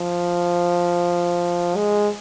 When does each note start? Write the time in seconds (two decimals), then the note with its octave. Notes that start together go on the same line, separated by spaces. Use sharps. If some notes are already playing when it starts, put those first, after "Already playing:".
Already playing: F3
1.76 G#3